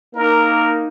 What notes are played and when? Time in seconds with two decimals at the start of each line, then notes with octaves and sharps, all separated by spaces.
0.15 A#3 D#4 A#4